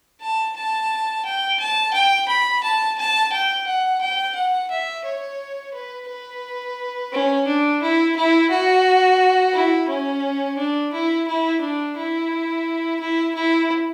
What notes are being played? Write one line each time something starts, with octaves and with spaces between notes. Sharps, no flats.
A5
A5
G5
A5
G5
B5
A5
A5
G5
F#5
G5
F#5
E5
C#5
B4
B4
C#4
D4
E4
E4
F#4
E4
C#4
D4
E4
E4
D4
E4
E4
E4